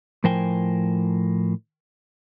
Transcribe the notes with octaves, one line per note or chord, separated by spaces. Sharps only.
A2 F3 A#4 C5 G5 G#5